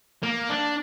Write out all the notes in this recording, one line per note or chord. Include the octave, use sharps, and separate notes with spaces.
A#3
D4